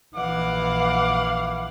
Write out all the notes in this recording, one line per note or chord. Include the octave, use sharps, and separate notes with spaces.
A#1 E3 F5 F#5 D6